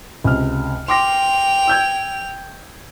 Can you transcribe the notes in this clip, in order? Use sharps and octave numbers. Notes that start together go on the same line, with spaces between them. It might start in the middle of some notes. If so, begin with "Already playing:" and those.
C#2 C3 F6
G5 C6 D6 A#6 F7
E6 G6 G#6